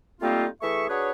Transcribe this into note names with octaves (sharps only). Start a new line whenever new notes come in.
G3 A3 A#3 C4 D#4 F4
E3 A3 G#4 E5 C#6
D4 F#4 G#4 B4 C#5